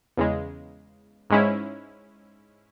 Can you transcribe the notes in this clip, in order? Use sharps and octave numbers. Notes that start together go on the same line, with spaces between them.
E2 C#3 G#3
G#2 G#3 C#4 E4